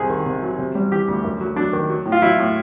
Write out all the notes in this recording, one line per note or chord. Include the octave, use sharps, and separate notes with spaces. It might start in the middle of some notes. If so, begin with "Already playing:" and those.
Already playing: C2 C3 G#4
D#3
C3
F#3
C3
G3
E3 G4
D2
F#2
F#3
F#3 D4
D#3
F#3
A2
F4
F#3 E4
A2